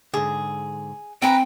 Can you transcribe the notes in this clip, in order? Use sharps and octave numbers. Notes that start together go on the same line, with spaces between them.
G#2 D3 G#4
C4 B4 G5 G#5 A#5